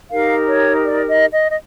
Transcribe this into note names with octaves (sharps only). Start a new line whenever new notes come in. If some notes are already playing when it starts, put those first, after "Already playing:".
D#4 G4 A#4 F5
C#5
D5
D#5
D#5
D#5